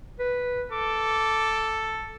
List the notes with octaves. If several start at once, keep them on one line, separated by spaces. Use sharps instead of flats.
B4
A4 D6